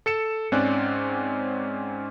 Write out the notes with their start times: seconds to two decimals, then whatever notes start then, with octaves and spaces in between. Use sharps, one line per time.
0.06 A4 C#7 E7
0.52 G#2 C4 C#4 D5 F#6